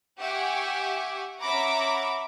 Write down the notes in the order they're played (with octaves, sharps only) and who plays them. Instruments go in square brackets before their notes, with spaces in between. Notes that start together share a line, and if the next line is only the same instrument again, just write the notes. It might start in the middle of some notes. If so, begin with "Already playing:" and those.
[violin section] G4 E5 F#5 G#5 C#6 D6
C#4 E5 F#5 A#5 B5 D6